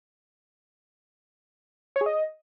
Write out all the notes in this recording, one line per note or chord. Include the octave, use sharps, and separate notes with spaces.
C#5
G#4
D#5